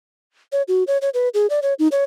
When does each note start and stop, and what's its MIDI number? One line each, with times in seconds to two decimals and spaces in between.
0.52 0.62 73
0.68 0.84 66
0.87 0.98 73
1.02 1.09 73
1.14 1.29 71
1.34 1.47 68
1.50 1.60 74
1.62 1.74 73
1.79 1.88 63
1.92 2.04 73